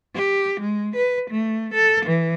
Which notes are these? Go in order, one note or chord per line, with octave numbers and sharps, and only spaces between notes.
G4
G#3
B4
A3
A4
E3